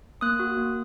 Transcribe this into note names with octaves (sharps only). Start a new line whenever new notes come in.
A#3 D#6 F#6
F#4
A#3